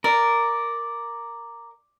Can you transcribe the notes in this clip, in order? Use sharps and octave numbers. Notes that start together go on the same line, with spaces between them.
A#4 D5